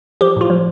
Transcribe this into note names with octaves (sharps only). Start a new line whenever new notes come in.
F3 G4
A2 F4
F3